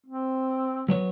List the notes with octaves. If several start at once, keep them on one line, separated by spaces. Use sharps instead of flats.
C4
F#3 B3 C#5